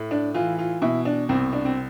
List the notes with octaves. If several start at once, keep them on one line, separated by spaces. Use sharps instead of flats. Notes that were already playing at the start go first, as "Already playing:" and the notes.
Already playing: A2
D4
E3 F4
F4
B2 E4
D4
C2 C4
D4
C4